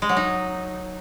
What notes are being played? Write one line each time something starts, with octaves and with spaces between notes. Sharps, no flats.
G#3
F#3
D#4